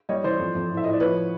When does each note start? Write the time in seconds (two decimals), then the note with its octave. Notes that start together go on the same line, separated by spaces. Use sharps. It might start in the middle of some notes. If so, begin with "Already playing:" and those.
0.09 G3 C#5 D#5
0.24 E3 C5 D5
0.39 F2
0.55 F2
0.70 A2
0.77 E5
0.84 A2 D#5
0.93 D5
1.00 F3 B4 C#5